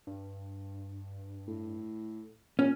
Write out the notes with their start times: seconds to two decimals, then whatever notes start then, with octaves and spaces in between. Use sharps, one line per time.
0.07 G2
1.47 A2
2.59 A#2 C#4